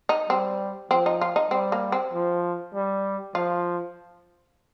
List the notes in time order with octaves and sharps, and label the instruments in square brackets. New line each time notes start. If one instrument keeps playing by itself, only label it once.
[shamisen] D#4
[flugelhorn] G3 [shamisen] C4
[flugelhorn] F3 [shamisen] C4
[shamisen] D#4
F4
D#4
[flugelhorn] G3 [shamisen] C4
[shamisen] A#3
C4
[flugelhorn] F3
G3
[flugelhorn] F3 [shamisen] F4